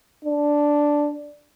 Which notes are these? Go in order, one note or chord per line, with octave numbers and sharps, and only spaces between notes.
D4